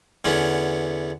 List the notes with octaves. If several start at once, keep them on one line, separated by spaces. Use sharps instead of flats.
E2 D3 B3 C#4